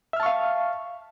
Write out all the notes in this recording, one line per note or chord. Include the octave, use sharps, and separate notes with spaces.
E5 F5 A5 C#6 F6